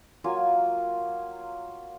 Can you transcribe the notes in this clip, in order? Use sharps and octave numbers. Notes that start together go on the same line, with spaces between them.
F#3 A#3 F4 G#5